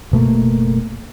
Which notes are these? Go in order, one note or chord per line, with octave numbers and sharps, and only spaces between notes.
F#1 B2 A3 A#3